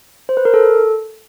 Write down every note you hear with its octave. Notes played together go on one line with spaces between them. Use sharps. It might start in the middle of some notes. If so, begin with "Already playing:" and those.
C5
B4
A#4
A4